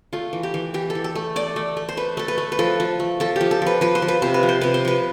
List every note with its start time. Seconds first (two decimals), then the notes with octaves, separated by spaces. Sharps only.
0.13 A3 F4
0.33 E3
0.43 G4
0.54 E3
0.74 E3 G4
0.90 A4
0.95 E3
1.04 A4
1.15 A3
1.36 A3 D5
1.56 A3
1.77 A3
1.89 C5
1.97 A3 B4
2.17 A3 A4
2.28 B4
2.38 A3
2.52 B4
2.59 F3 A4
2.80 F3
3.00 A3
3.20 F3 A4
3.36 F3 G4
3.51 A4
3.62 F3 B4
3.81 F3 B4
3.95 C5
4.02 F3
4.08 B4
4.22 C3 C5
4.34 B4
4.43 F3
4.49 C5
4.61 C3 B4
4.74 C5
4.85 F3 B4